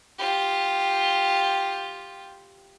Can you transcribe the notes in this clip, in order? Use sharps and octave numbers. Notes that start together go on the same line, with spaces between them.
F4 G4